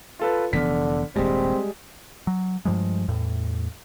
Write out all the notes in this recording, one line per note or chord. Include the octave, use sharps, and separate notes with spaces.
F4 A4 B4
F1 D3 E3 B3 F6 B6
D#1 G2 G3 G#3 C4
F#3
G2 F3 G3 G#3
E2 A2